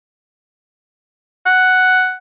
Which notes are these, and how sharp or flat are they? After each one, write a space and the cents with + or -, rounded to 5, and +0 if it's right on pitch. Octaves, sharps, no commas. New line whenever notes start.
F#5 +5